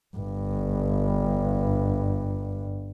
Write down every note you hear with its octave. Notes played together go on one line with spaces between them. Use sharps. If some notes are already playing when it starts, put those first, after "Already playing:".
G1 G2